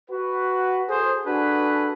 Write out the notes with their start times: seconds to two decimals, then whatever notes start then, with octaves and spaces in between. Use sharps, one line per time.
0.10 F#4 B4
0.88 G#4 A4 C5
1.26 D4 F#4 G#4 A4 B4